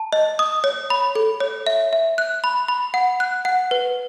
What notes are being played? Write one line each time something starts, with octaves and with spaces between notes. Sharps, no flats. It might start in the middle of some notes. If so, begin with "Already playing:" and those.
Already playing: A5
D#5
D#6
C#5
B5
A4
C#5
E5
E5
F#6
B5
B5
F#5
F#6
F#5
B4